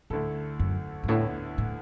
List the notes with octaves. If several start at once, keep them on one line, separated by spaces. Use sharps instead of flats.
D2 A2 D3 A3 E4 A4
F#2
F#2
D2 A2 D3 B3 E4 A4
A2